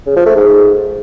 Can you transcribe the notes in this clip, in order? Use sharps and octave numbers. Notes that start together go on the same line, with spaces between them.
C#3
F3
A3
G#2